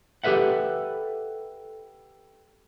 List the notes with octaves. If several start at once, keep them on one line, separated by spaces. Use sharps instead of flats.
G4 A4 B4 E5 F#5